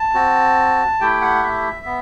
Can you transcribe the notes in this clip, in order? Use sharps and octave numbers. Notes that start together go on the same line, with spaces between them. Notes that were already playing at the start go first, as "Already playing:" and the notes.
Already playing: A5
C4 F#4
A3 E4 G4 G5
F#5
E5
B3